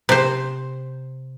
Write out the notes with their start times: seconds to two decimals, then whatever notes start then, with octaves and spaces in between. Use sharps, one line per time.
0.09 C3 C5